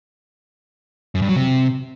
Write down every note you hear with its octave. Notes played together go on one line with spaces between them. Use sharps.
F#2
G2
F#3
C3